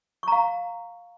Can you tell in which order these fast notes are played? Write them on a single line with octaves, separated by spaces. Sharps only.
C#6 A#5 F5